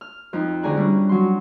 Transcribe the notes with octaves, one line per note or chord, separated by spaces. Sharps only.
F6
F2 D#4
D2 G#4 D5 G#5 A#5 F#6
G3 C#4 D4 E4
F#3 C6